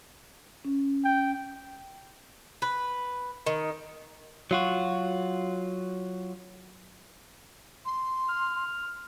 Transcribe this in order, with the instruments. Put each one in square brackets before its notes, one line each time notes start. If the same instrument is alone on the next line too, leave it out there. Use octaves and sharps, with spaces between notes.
[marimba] C#4
[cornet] G5
[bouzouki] B4
D#3
[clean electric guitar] F#3 F4 F#4
[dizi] C6
[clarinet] F6